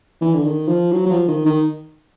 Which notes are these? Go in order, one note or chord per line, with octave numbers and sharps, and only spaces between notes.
E3
D3
D#3
F3
F#3
F#3
F3
D#3
D#3